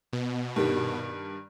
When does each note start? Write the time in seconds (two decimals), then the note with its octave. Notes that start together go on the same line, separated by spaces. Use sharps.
0.13 B2
0.56 G2 D#3 G3